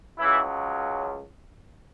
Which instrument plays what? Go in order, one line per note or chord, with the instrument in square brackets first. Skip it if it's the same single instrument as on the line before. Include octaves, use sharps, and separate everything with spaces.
[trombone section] C#2 C#3 E3 F#3 E4